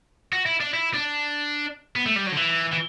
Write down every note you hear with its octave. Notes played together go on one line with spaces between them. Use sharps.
F#4
E4
D4
E4
D4
B3
A3
G3
F#3
D3
E3
E3